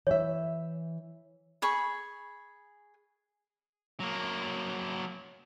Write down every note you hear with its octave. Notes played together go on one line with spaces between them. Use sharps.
E3 C#5 E5
G#4 B5 C#6
F#3 A#3